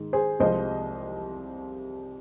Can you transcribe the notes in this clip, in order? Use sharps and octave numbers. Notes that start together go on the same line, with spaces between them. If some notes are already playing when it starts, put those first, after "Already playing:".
Already playing: G#2 D#3 G#3
G#4 C5
C2 C3 F3 G#3 C5 D#5